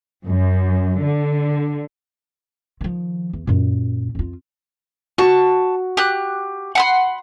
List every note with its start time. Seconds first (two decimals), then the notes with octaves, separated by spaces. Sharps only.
0.25 F#2
1.04 D3
2.81 D#3 F3
3.33 E2
3.47 F#2 A#2
4.15 F2 F4
5.18 F#4 A5 C#6
5.97 G4 F#6
6.75 F#5 B5 C6